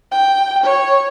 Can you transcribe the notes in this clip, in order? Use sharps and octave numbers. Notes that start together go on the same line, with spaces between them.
G5
C#5